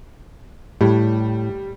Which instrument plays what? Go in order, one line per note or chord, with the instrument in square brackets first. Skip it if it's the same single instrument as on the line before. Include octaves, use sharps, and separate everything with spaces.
[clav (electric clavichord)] A2 [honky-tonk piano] G3